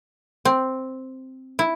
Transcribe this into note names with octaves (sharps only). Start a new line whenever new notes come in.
C4
E4